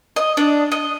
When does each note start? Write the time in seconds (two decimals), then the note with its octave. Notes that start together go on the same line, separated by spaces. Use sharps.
0.16 D#5
0.37 D4
0.72 D#5